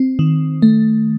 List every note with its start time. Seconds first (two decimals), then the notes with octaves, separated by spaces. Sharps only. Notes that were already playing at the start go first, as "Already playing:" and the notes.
Already playing: C4
0.19 D#3
0.62 A3